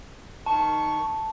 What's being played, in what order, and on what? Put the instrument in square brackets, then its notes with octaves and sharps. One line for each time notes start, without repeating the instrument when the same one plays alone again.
[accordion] D#3 C#6 [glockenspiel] A5